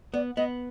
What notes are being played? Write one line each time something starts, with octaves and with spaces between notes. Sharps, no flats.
B3 D5
B3 D#5